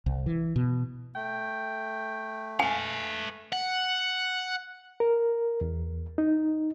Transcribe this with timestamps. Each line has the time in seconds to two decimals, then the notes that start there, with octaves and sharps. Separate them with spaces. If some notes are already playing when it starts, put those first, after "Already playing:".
0.06 C2
0.26 E3
0.56 B2
1.15 A3 G5
2.60 B4 F5 G#5
3.53 F#5
5.00 A#4
5.61 E2
6.18 D#4